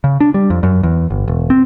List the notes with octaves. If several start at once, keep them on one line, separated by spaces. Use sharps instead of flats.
C#3
D4
G3
F2
F#2
E2
G1
E1
C4